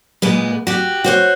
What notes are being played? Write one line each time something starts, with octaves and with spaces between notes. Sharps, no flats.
A#2 G#3 B3
F#4 G4
F#4 C5 C#5